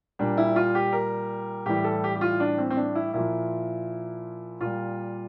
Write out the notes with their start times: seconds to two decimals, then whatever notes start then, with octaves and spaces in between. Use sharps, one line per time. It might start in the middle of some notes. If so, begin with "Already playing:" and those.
0.19 A#2 G3 D4
0.37 E4
0.56 F4
0.75 G4
0.93 A#4
1.66 A2 E3 G3 G4
1.84 A4
2.04 G4
2.15 G4
2.21 F4
2.40 D4
2.58 C4
2.70 C4
2.77 D4
2.95 E4
3.13 A#2 F3 E4
4.61 A#2 G3 F4